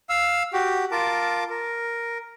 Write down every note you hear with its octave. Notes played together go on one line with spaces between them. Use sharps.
F5 E6
F#4 G4
F4 A#4 A5 D6
A#4